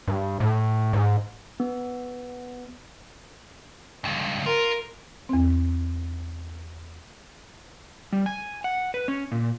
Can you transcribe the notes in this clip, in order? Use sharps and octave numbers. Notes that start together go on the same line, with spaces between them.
G2
A2
G#2
B3
C#2 G2
F4 A#4
E2 C4
G3
G#5
F#5
B4
C#4
A#2